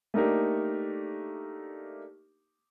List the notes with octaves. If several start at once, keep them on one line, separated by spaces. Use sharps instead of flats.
A3 A#3 D4 D#4 G4 A#4